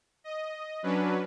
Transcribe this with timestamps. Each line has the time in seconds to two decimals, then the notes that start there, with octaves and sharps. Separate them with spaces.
0.24 D#5
0.83 F#3 C#4 D4 B4